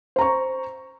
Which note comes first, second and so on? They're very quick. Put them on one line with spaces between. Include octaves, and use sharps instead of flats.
C5 A#5 C#6